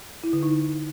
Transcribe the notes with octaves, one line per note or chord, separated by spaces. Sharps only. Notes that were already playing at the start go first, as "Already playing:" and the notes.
E4
D3
D#4